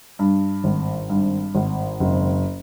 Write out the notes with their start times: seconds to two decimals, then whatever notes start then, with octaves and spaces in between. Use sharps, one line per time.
0.19 G2
0.64 G#1
1.10 G2
1.55 G#1
2.00 F#1